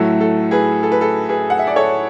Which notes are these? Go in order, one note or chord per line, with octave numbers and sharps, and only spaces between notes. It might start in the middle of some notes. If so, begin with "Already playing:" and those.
Already playing: A2 F#3 A3 A4
A4
G#4 B4
A4
B4
A4
G#4 B4
F#5
E5
D5
A4 C#5